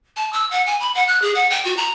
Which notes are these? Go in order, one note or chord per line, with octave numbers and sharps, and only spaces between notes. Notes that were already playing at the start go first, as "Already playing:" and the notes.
A5
E6
F#5
G#5
B5
F#5
F#6
G#4
F#5
G5
F#4
A#5